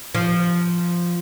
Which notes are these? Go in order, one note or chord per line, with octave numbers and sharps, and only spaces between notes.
F3